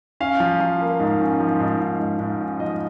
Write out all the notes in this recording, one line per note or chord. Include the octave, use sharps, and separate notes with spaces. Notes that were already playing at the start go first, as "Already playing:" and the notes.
C#4 F5
F3
F3
A#3
G#2
C#4
F3
G#2
G#2
G#2
G#2
C#4
F3 D#5